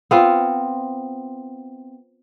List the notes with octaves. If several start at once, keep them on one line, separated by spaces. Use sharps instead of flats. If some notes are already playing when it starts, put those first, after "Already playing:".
B3 C4 F4